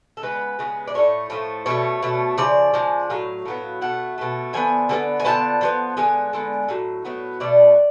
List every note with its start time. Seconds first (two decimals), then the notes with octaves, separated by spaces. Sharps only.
0.17 A4
0.22 C#3 G#3 B3 B4
0.59 C#3 G#3 B3
0.87 D5
0.94 A2 F3 A3 C#5
1.30 A2 F3 A3
1.66 B2 A3 C#5
2.03 B2 A3
2.38 C#3 F3 D5
2.74 C#3 F3 G#3
3.10 A2 F#3 F5
3.46 A2 F#3 B3
3.81 B2 A3 F#5
4.18 B2 A3
4.53 D3 F3 B3 G#5
4.89 D3 F3 B3
5.20 G#5
5.25 D3 F3 B3 A5
5.61 D3 F3 B3
5.97 D3 G#3 B3 G#5
6.33 D3 G#3 B3
6.69 A2 F#3
7.05 A2 F#3 B3
7.40 B2 A3 D5